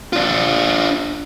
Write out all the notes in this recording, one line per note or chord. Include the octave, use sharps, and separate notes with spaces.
D4 F4